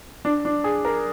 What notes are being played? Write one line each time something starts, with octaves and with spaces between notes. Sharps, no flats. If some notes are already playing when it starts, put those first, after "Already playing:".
D4
D4
G#4
A#4